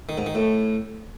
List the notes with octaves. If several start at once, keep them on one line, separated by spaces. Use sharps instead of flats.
D#3
G#2
D#3
A2